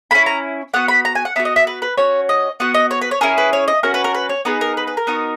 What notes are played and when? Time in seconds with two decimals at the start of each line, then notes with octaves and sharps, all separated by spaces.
0.11 A#3 B5
0.14 C#4 E4
0.26 A#5
0.74 B3 F#4 F#5
0.88 B5
1.05 A#5
1.15 G#5
1.25 F#5
1.36 B3 D#4 E5
1.39 F#4
1.45 D#5
1.56 E5
1.67 B4
1.82 B4
1.98 C#4 F#4 C#5
2.29 D#5
2.60 B3 F#4 F#5
2.74 D#5
2.91 C#5
3.01 B4
3.11 C#5
3.21 C#4 E4 G#4 A#4
3.38 B4
3.53 C#5
3.68 D#5
3.83 C#4 F#4 A#4
3.94 B4
4.04 A#4
4.15 B4
4.29 C#5
4.45 B3 D#4 G#4 B4
4.61 A#4
4.77 B4
4.87 B4
4.97 A#4
5.07 B3 D#4 F#4